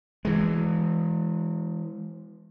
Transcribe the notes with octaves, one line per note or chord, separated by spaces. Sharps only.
E3 G#3